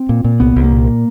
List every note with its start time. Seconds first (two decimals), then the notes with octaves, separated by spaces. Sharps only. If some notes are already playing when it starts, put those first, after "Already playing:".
Already playing: C4
0.09 A#2
0.24 A#2
0.40 C2 B3
0.56 C2
0.64 A#3
0.72 A#2